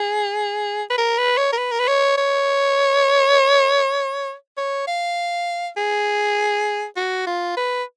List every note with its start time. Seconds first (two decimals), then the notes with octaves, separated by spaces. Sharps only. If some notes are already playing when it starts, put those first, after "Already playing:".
Already playing: G#4
0.90 B4
0.98 A#4
1.18 B4
1.38 C#5
1.53 A#4
1.58 B4
1.71 A#4
1.79 B4
1.88 C#5
2.18 C#5
4.57 C#5
4.87 F5
5.77 G#4
6.97 F#4
7.27 F4
7.57 B4